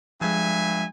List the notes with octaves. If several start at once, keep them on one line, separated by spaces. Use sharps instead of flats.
G2 F3 G#3 E5 G#5